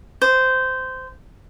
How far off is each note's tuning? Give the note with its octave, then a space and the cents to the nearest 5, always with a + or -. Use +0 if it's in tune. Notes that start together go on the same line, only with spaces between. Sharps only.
C5 -15